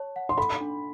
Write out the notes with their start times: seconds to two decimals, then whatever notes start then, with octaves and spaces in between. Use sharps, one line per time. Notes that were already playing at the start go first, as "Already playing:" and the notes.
Already playing: C#5 A5
0.16 F#5
0.29 C6
0.37 A4 B5
0.61 D4